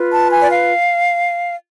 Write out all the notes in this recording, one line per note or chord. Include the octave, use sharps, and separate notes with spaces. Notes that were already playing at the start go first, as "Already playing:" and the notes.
Already playing: F4 B4
A5
G#5
D5
F5